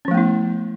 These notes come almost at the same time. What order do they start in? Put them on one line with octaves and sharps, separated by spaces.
C#4 F3 A3 B3 E4